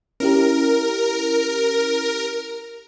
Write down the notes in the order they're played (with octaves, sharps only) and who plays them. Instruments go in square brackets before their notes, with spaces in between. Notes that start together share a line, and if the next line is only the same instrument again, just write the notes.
[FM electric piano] C#4 E4 G4 [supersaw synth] A#4